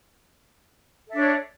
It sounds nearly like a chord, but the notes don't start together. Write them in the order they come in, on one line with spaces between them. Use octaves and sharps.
A4 E5 D4 C#5